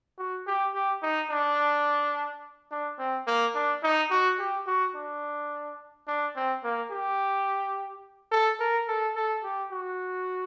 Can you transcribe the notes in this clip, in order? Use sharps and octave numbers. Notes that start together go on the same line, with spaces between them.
F#4
G4
G4
D#4
D4
D4
C4
A#3
D4
D#4
F#4
G4
F#4
D4
D4
C4
A#3
G4
A4
A#4
A4
A4
G4
F#4